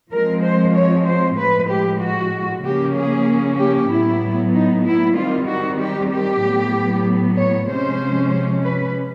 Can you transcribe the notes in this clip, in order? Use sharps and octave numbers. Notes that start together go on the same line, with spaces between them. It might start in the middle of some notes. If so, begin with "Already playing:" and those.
F3 G#3 C4 A#4
C5
C#5
C5
A2 F3 G#3 B4
G4
F#4
C#3 F3 A#3 C#4 G4
G#4
G4
A2 F#3 B3 E4
D#4
E4
D#3 G3 C4 F4
F#4
G4
G4
A2 F#3 B3
C#5
C3 F3 G#3 C#4 C5
B4